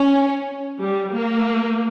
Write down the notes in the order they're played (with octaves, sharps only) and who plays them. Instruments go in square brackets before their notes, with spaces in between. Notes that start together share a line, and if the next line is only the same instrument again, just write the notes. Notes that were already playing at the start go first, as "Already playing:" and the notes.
Already playing: [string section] C#4
G3
A#3